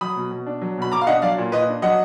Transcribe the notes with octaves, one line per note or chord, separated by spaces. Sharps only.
F#3 B5 D#6
B2
B2
D4
F#3
B2 B5
B2 A#5 D6
F5
D4 D#5 F#5
F#3 D5 F5
A#2
A#2 B4 D#5
D4
F#3 D#5 F#5